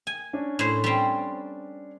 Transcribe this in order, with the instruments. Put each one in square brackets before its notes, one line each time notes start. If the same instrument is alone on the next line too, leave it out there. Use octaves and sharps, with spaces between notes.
[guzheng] G#5
[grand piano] C#4 D4
[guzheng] A2 C5
G3 C4